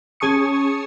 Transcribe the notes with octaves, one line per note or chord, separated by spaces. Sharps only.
C#4 G#4 A5 C#6 D#6 C#7